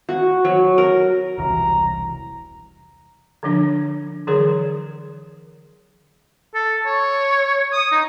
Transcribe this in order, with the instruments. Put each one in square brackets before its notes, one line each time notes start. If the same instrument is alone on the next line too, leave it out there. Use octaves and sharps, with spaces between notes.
[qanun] F#4
F#3
A#4
[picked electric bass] E1 C2 E3 [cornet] A#5
[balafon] D3 F3 D4
D3 E3 F#3 G#4 A#4 C#5
[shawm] A4
C#5
D#6
D#4